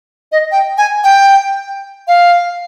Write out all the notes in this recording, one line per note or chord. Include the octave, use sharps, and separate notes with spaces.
D#5
G5
G#5
G5
F5